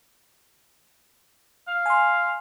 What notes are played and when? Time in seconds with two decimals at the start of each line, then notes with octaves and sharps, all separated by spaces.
1.68 F5
1.86 G#5 C6